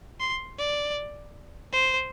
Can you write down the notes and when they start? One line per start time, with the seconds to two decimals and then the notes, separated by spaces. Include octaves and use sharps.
0.20 C6
0.59 D5
1.73 C5